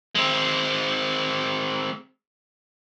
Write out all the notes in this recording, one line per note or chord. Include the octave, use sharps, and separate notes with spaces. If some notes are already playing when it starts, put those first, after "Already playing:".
G#3 C4